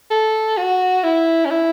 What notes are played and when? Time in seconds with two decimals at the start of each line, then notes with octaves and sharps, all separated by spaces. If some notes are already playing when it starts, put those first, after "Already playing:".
0.11 A4
0.57 F#4
1.04 E4
1.45 C#4
1.50 E4